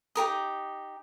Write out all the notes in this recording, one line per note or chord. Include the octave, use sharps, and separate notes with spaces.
D#4 G4 A#4 D#6